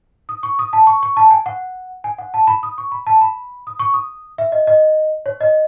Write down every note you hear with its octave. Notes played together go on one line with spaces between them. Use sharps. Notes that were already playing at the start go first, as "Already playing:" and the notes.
D#6
C#6
D#6
A5
C#6
C#6
A5
G#5
F#5
G#5
F#5
A5
B5
D#6
C#6
B5
A5
B5
D#6
C#6
D#6
E5
D#5
D#5
C#5
D#5